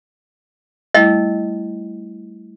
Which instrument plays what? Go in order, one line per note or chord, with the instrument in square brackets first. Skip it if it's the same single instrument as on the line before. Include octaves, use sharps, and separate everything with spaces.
[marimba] G3 A3 E4 [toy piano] D#5